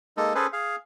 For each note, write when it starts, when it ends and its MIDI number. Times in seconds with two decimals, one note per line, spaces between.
0.17 0.33 56
0.17 0.33 58
0.17 0.33 63
0.17 0.33 69
0.35 0.47 61
0.35 0.47 68
0.35 0.47 69
0.35 0.47 71
0.35 0.47 72
0.53 0.76 68
0.53 0.76 77